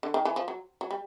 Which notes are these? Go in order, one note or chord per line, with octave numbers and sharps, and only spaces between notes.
D3
D#3
E3
F3
F#3
F#3
G3